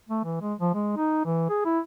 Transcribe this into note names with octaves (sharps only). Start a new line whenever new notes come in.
A3
E3
G#3
F3
G#3
D#4
E3
G#4
E4